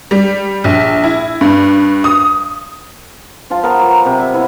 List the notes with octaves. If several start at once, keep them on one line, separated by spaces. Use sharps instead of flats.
G3
A#1
E4
G2
D#6
F3 F4 A5
B3 A#4 A#5
F#3
C3
E5
B3 E4 C5